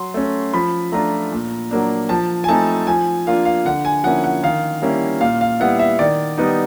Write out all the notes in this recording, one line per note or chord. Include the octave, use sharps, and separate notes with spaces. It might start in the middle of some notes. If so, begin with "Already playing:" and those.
Already playing: F#3 C6
A3 C#4
F3 B5
A3 D4 F4 A#5
A#2
F#3 A#3 D4
F3 A5
G#5
A3 C4 D#4 A5
F3 G#5
A#3 D4 F4 F5
F5
D3 F#5
G#5
F3 A#3 C#4 E4 F#5
F#5
D#3 F5
G3 A#3 C#4 E4
A#2 F5
F5
G3 B3 E4 F#5
E5
D#3 D5
G3 B3 D#4